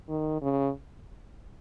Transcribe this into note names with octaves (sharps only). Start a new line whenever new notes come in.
D#3
C#3